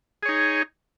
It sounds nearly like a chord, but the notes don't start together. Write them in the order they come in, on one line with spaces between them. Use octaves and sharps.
G#4 C#5 D#4